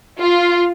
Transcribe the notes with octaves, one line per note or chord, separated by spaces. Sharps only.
F4